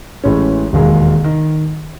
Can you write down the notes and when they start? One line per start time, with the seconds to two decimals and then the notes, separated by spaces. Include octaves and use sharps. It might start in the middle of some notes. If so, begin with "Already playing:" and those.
0.24 A1 A2 E3 G#3 C#4
0.73 E1 D#2 D#3 G#3
1.24 D#3